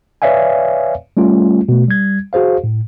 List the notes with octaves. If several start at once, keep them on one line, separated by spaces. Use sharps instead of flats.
B4 C#5 D5 E5 F5 G#5
G3 A3 C#4 F4
B2 A3
G3 G#6
F#4 G#4 C5 F5
A2